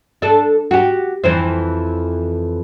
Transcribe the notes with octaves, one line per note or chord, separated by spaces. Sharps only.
D4 A4
F#4 G4
F2 E3 C5